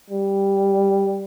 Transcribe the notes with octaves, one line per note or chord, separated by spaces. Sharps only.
G3